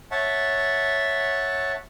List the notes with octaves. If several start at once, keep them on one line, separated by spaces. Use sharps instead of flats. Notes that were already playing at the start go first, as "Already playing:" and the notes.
C#5 E5 F#5 A5